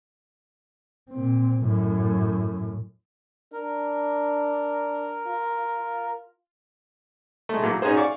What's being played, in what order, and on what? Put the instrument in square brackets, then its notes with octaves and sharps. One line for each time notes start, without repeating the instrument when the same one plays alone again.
[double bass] A#2 C4
F#2 A2
[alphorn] D4 [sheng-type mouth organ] A#4
[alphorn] F4
[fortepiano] G#3 A3
A2 F#3 A#3
C#4 D#4 F#4 G#4 C5
D5 F5 C#6 D6